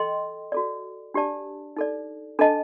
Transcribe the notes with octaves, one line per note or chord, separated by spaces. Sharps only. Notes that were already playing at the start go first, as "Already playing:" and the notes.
Already playing: A4 D#5 G5 C6
F#4 A4 D5
D4 G4 D5 A5
D#4 A4 D5
D4 A4 D#5 A5